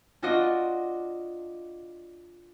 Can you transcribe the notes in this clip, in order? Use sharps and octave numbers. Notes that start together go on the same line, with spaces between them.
D4 F4 F#4 D5 D#5